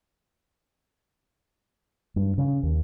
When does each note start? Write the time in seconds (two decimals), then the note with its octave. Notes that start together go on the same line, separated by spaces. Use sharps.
2.16 G2
2.38 C#3
2.63 D#2